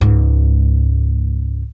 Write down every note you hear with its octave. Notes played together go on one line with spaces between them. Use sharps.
C#2 G#2